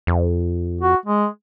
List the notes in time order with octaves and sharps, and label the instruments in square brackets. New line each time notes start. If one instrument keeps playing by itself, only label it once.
[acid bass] F2
[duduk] F#4
G#3